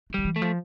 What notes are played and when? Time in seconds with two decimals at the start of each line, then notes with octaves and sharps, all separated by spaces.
0.10 E3
0.14 D3 G3
0.25 E3
0.36 A3
0.42 F3